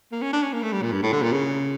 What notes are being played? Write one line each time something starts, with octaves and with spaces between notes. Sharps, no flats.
A#3
C#4
D4
C#4
A#3
A3
G3
A#2
G2
A2
D3
A#2
C#3